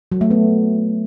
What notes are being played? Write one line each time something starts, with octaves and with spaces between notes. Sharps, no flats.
F#3
A3
B3